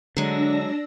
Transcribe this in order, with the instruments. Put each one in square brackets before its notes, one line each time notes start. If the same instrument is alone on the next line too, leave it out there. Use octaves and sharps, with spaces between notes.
[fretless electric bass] D3 [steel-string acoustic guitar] F#3 G#3 [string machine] D4 E6 A#6